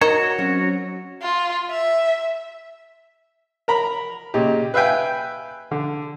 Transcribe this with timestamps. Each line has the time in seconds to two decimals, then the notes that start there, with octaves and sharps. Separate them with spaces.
0.01 D#4 F#4 A#4 C#5 E7
0.38 F#3 C4 C#4
1.22 F4
1.70 E5
3.68 A#4 A#5 B5
4.34 A#2 C#3 D#4 G4
4.74 B4 E5 F5 G5 G#5
5.71 D3